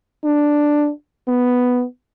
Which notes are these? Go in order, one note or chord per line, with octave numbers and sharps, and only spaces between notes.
D4
B3